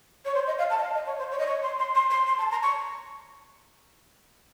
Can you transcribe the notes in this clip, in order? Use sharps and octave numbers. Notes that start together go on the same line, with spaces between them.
C#5
C5
D#5
F5
A5
D#5
F5
D#5
C#5
C5
C#5
D#5
C#5
C6
C6
C6
C6
C6
A5
A#5
C#6